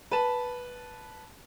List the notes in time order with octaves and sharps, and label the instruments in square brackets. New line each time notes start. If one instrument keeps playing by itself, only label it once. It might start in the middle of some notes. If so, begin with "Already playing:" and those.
[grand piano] B4 A5